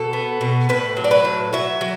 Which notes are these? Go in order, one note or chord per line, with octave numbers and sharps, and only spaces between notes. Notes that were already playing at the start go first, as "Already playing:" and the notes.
Already playing: B2 A4
B3
B2
A2 B4
F#3
D5
B4
A2
F#3 E5
F#3